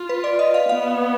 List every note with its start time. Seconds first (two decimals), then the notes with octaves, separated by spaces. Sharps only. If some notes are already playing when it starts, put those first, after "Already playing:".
Already playing: F4
0.09 B4
0.24 D5
0.39 D#5
0.54 F5
0.69 B3 F5